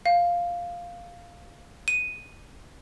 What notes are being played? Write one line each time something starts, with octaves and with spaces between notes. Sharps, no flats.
F5
D#7